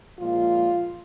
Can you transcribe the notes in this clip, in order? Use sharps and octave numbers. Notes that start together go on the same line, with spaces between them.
A#2 F3 G#3 F4